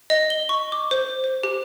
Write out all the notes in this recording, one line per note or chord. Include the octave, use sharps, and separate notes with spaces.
D#5
G7
C#6
D6
C5
C5
G4